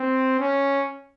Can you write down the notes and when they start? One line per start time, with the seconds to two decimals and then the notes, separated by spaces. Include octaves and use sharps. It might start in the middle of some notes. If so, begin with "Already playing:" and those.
Already playing: C4
0.40 C#4